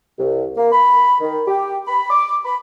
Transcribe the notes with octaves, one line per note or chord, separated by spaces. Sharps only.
C2
A#3
B5
D#3
G4
B5
D6
B5